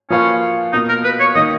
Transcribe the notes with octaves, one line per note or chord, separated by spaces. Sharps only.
F3 A#3 C#4 F4 B4 F5
B2 A#3 D#4 F4
A#4
B4
C#5
D#3 A#3 D#4 D#5